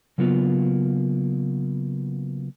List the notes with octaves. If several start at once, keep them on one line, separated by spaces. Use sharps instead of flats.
C#3 F#3 A#3 B3 F4